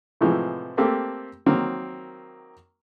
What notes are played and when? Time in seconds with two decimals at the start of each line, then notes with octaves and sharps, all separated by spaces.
0.21 A2 C3 E3 F3 G#3
0.77 A3 A#3 C4 G4 A4
1.46 D#3 F#3 A#3 C4 A#4